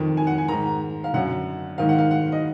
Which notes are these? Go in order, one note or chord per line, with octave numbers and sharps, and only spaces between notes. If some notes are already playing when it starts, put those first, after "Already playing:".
Already playing: F2 D#3
G#5
F#5
G#5
G#2 D#3 A#5
F5
F#2 D3 F#5
G#2 D#3 F5
F#5
F5
F#5
D#5